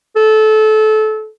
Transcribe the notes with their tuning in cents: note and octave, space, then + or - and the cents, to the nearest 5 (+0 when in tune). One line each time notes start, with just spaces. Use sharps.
A4 -25